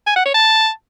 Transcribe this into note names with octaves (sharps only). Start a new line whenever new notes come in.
G#5
F#5
C#5
A5